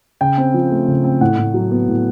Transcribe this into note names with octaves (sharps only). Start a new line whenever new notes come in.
C#3 G5
C4
F3
A3
C#3
C4
A2 F#5
A2
F#3
B3
A2